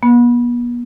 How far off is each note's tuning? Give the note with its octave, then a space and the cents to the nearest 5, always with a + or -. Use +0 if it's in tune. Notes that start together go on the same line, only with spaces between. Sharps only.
B3 -40